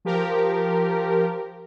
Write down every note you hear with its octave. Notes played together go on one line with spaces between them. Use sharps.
F3 G4 A#4